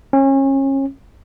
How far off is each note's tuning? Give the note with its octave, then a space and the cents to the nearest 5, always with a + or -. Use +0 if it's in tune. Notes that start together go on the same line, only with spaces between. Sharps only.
C#4 -30